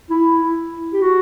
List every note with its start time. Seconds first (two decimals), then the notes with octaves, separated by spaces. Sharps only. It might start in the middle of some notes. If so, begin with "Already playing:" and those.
0.10 E4
0.93 G4
1.02 F#4